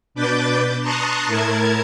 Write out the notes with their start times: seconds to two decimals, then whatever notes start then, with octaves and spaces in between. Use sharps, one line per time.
0.15 B2 D4 B4 D6 G6 A6
0.81 A5 A#5 C6 C#6 D#6 F#6
1.27 A2 E4 A#4 A5 G#6